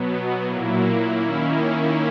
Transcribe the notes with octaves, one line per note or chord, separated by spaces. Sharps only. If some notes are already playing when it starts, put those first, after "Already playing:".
Already playing: B2 F#3 B3
A#2 F#3 A#3 E4
D#3 A#3 C#4 E4